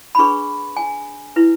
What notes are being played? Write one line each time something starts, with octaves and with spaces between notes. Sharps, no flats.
B5
D4 G#4 B4 C#6
G#5
E4 B4